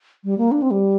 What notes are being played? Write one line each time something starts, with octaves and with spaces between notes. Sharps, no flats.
G3
A#3
D4
C4
G3